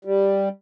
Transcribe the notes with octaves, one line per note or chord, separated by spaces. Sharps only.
G3